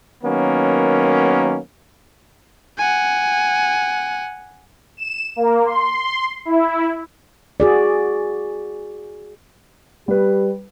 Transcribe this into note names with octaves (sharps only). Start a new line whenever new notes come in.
D#3 F#3 A#3 B3 C#4
F#5 G#5
E7
A#3
C6
E4
F#4 G#4 D5
G3 G4 B4